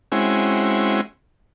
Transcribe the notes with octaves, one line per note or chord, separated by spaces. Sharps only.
G#3 C4 C#4 E4 F#4